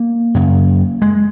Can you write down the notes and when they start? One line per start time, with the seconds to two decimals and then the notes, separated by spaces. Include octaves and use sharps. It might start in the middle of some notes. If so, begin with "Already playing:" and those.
Already playing: A#3
0.35 F#2 C#3
1.02 G#3